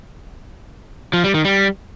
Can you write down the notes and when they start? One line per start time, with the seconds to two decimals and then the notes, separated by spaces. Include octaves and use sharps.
1.13 F3
1.24 G3
1.34 D#3
1.45 G3